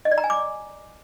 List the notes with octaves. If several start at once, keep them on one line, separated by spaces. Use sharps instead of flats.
D#5
D5
A#5
G#5
D6